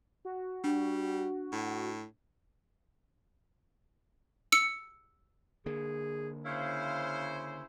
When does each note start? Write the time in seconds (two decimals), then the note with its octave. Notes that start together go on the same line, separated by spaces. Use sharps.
0.25 F#4
0.64 G3 D4
1.52 A2
4.52 E6 C#7
5.66 D3 A#3 G#4
6.45 C#3 E4 C5 F5